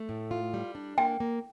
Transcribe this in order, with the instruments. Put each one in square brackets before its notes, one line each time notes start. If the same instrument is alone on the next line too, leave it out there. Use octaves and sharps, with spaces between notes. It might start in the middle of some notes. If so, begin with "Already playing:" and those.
Already playing: [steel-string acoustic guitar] A3
A2
F4
G3
D4
[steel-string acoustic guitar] A#3 [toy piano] G5
[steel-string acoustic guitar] A#3